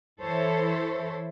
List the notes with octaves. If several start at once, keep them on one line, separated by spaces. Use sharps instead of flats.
E3 E4 A4 C5 C#5